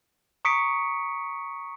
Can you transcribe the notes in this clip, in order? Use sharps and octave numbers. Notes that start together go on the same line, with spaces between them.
A#5 C#6 D#6 B6 C#7 D7